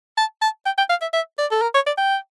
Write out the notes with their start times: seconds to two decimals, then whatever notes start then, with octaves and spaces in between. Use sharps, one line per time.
0.18 A5
0.42 A5
0.66 G5
0.78 G5
0.90 F5
1.02 E5
1.13 E5
1.38 D5
1.51 A4
1.62 A#4
1.74 C#5
1.86 D5
1.98 G5